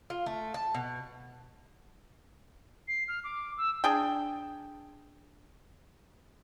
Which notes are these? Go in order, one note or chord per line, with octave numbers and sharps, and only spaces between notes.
F4
A3
A5
B2
C7
F6
D6
E6
D4 G#4 G5